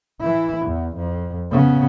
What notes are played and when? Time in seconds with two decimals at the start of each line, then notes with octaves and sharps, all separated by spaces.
0.21 E3 E4
0.66 E2
0.96 F2
1.51 C#3 B3